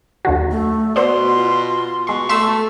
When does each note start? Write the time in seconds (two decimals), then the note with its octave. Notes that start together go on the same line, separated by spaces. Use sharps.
0.25 D#2 D3 F#3
0.51 A3
0.96 B2 B3 F#4 C5 D5 C6
1.34 F4
2.07 B2 G#3 C6 C#6
2.29 A3 A4 E5 C6 E6